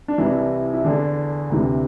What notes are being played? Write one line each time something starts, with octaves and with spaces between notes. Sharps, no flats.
D4
C2 C3 E3 E4
E4
E2 D3 D4
D2 C3 E3